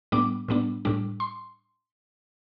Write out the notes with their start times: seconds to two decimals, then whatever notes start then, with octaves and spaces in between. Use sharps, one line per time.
0.12 A2 G3 B3 D4 D6
0.48 A2 G3 B3 D4
0.85 A2 G3 D4
1.20 C6